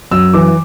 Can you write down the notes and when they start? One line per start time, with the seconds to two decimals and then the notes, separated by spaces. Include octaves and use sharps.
0.11 F#2 E6
0.34 E3 D6